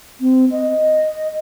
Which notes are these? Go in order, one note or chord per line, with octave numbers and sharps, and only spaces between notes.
C4
D#5